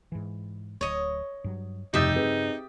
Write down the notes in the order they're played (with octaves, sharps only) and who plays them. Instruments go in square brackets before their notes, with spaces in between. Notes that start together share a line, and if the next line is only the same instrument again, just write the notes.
[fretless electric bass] G#2 E3
[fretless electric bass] D1 [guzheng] C#5 D#5
[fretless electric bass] G2 F#3
[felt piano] F1 D#6 A6 [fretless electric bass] G2 C#3 [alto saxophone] D#4 [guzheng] G4 E5
[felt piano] C4 G#4 B4